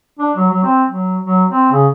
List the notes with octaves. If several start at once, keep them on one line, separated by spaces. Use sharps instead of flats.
D4
F#3
F#3
C4
F#3
F#3
C4
C#3